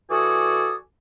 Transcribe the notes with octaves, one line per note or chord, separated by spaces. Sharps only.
E3 F#4 A4 D5 G#5 D#6